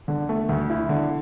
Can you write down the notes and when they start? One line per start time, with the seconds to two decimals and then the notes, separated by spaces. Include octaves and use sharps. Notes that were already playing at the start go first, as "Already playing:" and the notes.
0.08 D3
0.29 A3
0.49 D2
0.70 E4
0.89 D3